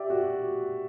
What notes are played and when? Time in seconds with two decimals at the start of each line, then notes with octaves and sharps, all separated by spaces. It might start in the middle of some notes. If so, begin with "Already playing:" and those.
Already playing: G4 D5 E5
0.10 F#4